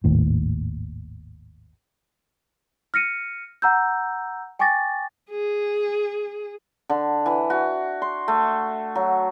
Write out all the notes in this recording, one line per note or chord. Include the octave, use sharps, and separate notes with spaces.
G#1 D#2 A2
F6 A#6 C#7 D#7
F#5 A#5 E6 G6
G5 G#5 C#6 D6 A6 A#6
G#4
D3
E3
F#4
C6
A3
F#3